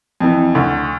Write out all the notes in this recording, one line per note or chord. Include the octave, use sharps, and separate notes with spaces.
F2 E3
D2